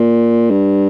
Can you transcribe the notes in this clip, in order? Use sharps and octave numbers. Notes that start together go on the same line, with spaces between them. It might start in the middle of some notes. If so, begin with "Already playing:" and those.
Already playing: A#2
G2